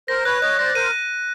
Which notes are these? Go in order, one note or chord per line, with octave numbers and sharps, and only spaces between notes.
A#4 C5 A#6
B4 C#5 F#6
C#5 D#5 F#6
C5 D5 A#6
A#4 C5 D#7